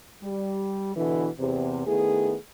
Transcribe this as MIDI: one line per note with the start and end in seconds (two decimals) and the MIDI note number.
0.23 0.94 55
0.96 1.27 47
0.96 1.27 50
0.96 1.27 52
1.39 1.83 40
1.39 1.83 48
1.86 2.35 51
1.86 2.35 57
1.86 2.35 59
1.86 2.35 64
1.86 2.35 68